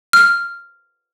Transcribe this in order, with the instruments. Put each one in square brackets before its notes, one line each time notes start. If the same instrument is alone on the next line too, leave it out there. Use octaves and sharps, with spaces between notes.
[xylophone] F6